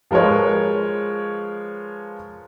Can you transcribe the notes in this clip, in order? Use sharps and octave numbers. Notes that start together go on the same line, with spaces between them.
F3 G#3 A#4 B4 C#5